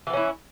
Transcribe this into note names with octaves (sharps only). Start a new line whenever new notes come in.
E3 B3 C#4 E4